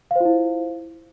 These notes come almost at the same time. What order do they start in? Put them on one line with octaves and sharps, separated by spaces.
F5 C5 F4 E4